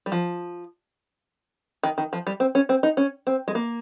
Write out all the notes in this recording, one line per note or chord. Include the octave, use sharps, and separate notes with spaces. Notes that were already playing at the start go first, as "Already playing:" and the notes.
G3
F3
D#3
D#3
F3
G3
C4
C#4
C4
D#4
C#4
C4
G#3
A#3